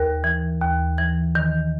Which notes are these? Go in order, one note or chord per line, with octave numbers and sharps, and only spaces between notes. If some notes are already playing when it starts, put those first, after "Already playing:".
Already playing: D#2 A#4
E3
D#2
E3
D#3